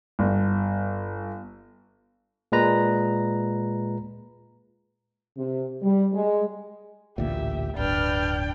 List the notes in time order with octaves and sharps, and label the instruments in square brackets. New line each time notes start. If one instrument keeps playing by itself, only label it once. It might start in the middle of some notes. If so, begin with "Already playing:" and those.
[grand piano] G1
[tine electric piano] A#2 G#3 B4 A#5
[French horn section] C3
G3
G#3
[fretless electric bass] A1 D2 A#2 [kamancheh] G4 E5
[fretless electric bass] D1 G1 [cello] D4 G5 [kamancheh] B4 F6